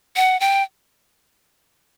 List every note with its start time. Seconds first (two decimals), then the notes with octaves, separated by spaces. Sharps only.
0.16 F#5
0.40 G5